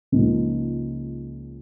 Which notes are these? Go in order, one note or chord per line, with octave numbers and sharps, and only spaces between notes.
C#2 C#3 F3 A#3 D#4